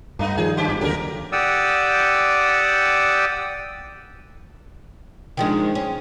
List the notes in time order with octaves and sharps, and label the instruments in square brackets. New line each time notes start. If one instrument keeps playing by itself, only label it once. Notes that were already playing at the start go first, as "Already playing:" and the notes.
[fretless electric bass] G2 [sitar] A3 B3 D#4
[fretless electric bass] D#3 F3 G3 [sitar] G#4
[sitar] F#2 G4
[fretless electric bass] G#1
[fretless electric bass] D#2 D3 F#3 [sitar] G4 A4 A#4
[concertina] G4 D5 F#5 D#6 E6
[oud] D#3 F3 G#3 [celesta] D4 G5
[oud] C#4